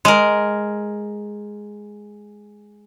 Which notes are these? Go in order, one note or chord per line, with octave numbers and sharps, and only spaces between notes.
G#3 A#4